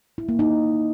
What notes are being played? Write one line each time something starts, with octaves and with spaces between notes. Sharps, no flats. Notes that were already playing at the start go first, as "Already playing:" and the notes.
E4
A#3
D#4